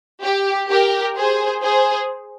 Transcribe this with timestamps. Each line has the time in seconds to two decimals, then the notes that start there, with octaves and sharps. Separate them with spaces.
0.22 G4
0.69 G4 A#4
1.16 G#4 C5
1.62 G#4 C5